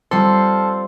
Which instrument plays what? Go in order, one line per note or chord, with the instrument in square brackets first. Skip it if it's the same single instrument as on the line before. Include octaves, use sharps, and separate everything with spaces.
[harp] G3 C6 [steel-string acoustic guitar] C4 F4 [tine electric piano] A4